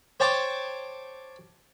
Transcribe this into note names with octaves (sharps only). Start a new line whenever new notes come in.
C5 C#5 G5 A5 C#6 D6